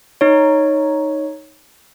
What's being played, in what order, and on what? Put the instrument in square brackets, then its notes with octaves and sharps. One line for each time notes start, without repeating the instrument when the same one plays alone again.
[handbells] D#4 C#5